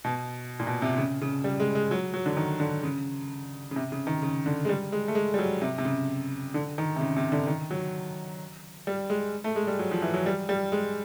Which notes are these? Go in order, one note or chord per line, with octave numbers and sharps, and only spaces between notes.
B2
A#2
B2
C3
C#3
C#3
G3
G#3
G#3
F#3
F#3
D3
D#3
D3
C#3
C#3
C3
C#3
D#3
C#3
D3
G#3
G3
G#3
A3
G#3
G3
F#3
C3
C3
C#3
D3
D#3
C3
C#3
C3
D3
D#3
F#3
G3
G#3
A3
G#3
G3
F#3
F3
E3
F#3
G3
G3
G#3